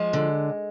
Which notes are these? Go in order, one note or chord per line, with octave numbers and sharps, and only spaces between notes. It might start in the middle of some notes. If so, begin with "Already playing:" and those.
Already playing: F3 G#3
D3